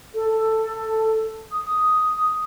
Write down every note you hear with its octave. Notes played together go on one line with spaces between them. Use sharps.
A4
D#6